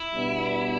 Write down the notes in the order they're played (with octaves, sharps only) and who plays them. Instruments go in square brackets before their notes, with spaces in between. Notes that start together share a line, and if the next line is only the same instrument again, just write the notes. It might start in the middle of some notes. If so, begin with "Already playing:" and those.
Already playing: [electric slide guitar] E4
[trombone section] B2 G3 B3 D4